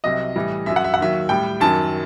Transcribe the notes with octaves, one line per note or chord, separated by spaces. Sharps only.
C2 C3 F#3 D#5
A2 E3 G3
F#2 F#3 E5
F#5
E5
F#5
D#2 D#3 F#3 E5
A2 G3 G5
F#2 D#3 F#3 A5